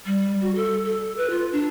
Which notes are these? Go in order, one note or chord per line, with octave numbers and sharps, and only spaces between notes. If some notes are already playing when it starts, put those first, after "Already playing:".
G3
F#4
A4
A4
B4
F4
D4